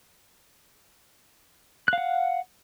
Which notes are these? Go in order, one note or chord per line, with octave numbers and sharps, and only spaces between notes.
F5 F#5 F#6